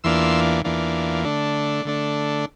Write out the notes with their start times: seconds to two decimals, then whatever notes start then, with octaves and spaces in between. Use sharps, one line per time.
0.04 E2 E3 A#3 D4 F4 C6 E6
0.65 E2 E3 A#3 D4 F4
1.25 D3 A3 D4
1.85 D3 A3 D4